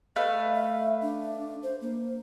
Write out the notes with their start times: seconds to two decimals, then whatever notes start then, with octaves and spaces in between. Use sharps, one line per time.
0.16 A3 B4 D#5 F5
0.54 E5
1.02 D4
1.63 C5
1.81 A#3